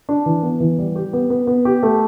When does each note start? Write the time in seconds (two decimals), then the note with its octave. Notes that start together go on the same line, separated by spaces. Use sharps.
0.09 D4
0.26 E3
0.43 B3
0.60 E3
0.78 G3
0.96 G4
1.13 B3
1.30 B3
1.47 B3
1.65 G4
1.83 A3